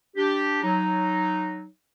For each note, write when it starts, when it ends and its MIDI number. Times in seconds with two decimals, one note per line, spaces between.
0.17 0.60 62
0.17 0.60 67
0.63 1.65 54
0.63 1.65 63